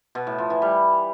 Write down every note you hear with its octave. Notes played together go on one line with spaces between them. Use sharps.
B2
A2
F3
E3
G3